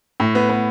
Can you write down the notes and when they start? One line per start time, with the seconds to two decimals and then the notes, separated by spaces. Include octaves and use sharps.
0.20 A2
0.35 B3
0.49 B3